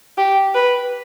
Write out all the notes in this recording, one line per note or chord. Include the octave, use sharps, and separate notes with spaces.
G4
B4